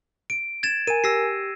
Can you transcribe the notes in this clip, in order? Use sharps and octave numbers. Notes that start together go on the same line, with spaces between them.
D7
G#6 A6 E7
A#4 G#5 D#7
G4 E6 A#6 C7